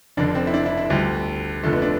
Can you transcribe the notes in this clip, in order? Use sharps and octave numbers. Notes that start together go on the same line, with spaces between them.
F1 F2 D3 F3 D4
C4
E4
D4
E4
E4
D2 D3 F3 G3
F1 F2 D3 F3 A3
B3
D4